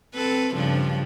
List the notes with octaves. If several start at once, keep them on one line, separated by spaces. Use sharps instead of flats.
C4 A4 B4
G2 C#3 F3